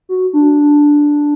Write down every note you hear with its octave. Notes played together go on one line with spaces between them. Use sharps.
F#4
D4